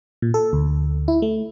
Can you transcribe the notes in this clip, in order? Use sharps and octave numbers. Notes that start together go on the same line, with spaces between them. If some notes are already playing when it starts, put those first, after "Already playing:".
A#2
A4
D2
E4
A3